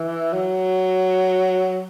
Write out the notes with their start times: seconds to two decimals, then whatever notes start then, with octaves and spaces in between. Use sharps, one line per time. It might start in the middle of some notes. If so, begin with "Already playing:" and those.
Already playing: E3
0.33 F#3